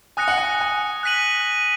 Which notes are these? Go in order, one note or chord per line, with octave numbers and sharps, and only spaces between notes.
G#5 D#6 F#6 A#6 C#7
F#5
G#5
G#5
F#6 B6 D#7 F#7